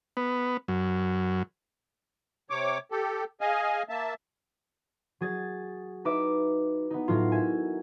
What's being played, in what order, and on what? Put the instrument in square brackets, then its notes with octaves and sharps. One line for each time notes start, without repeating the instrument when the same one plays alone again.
[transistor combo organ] B3
F#2
[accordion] C3 C#5 D6
G4 A4
G#4 D#5 F5 G#5
A#3 E5 A5
[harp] F#3 G#4 A6
D#4 B4 E5 D6
B3 D#4
A2 F#3 F4
A#4 E5 G#5